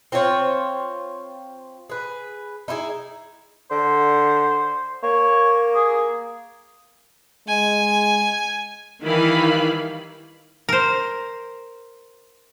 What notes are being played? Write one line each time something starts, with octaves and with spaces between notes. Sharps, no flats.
C4 F4 C5 C#5
G#4 B4
D#4 E4 G4 G#4
D3 C5
A#3 C#5
G#4
G#3 G#5
D#3 E3 G3 E4 F5 B5
A#4 C5